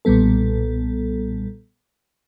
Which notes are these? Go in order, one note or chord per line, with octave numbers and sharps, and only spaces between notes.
B1 A#2 G3 B3 A4